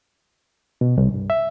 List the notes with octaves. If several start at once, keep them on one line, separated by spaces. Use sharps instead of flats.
B2
C2
G2
E5